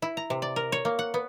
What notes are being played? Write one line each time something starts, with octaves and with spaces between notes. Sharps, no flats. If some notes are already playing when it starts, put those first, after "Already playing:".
E4
A#5
C3
D5
A#4
C#5
A#3
F#5
B3